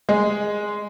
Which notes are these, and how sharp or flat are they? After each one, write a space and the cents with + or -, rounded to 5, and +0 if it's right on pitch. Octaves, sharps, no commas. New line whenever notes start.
G#3 +0 G#4 +0